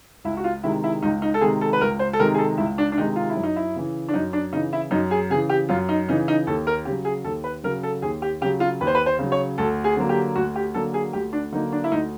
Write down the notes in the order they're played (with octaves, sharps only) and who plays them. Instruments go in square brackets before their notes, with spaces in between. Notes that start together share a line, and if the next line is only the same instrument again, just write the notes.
[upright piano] C#2 E4
F#4
F4
C3 D#3 G#3 E4
E4
C#2 D#4
D#4
A4
C3 D#3 G#3 G#4
A4
B4
C#2 A#4
C5
A4
C3 D#3 G#3 A#4
G#4
A4
C#2 E4
D4
D4
C3 D#3 G#3 D#4
F4
E4
F#2
D#4
E4
C#3 E3
D4
F#2 D#4
D4
C#3 D#4
E3
E4
F#2 D#4
G#4
C#3 G#4
E3
G4
F#2 F4
D#4
C#3 E3 D#4
D#4
D#2 A4
A#4
C#3 G4
F#3
G#4
D#2 A4
B4
C#3 F#3 A#4
A4
D#2 G#4
G4
C#3 F#3 G4
F4
D#2 B4
C5
B4
C5
C#3 F#3
C#5
D2 A4
G#4
D3 F#3 A#3
G4
D2 F#4
G4
D3 F#3 A#3 A4
G#4
D2 G4
D4
D3 F#3 A#3 D#4
D4
E4
D2 D#4